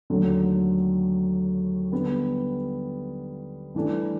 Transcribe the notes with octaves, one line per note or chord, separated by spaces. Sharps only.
D#2 D3 F#3 A3
D3 G3 B3
G2 E3 A3 D4